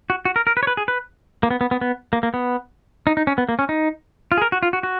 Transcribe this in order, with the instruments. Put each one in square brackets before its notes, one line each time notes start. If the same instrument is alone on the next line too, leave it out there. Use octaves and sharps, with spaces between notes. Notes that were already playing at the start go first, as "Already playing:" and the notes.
[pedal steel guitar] F#4
F#4
A#4
A#4
B4
C#5
B4
G#4
B4
A#3
B3
B3
B3
B3
A#3
A#3
B3
D#4
D#4
C#4
B3
A#3
C#4
D#4
F4
G#4
A#4
F#4
F4
F#4
F#4